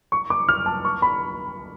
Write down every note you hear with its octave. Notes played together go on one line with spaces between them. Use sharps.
C#6
D6
F6
A5
C#6
B5